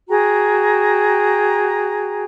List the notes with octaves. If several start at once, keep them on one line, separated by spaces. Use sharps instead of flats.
F#4 G#4 G5 A#5